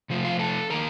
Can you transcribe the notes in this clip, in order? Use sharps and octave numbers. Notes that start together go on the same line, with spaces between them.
C3 F3 A3
F4 F5
A4 A5
D#3 A#3 A#4 A#5